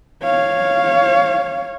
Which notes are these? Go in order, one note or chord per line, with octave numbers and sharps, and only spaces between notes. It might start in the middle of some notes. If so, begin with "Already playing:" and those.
C#5 F5